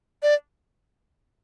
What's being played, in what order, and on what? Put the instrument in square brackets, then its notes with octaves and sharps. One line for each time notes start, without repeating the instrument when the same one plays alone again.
[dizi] D5